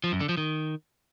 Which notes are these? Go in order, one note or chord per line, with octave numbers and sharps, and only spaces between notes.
F3
F#2
D3
F3
D#3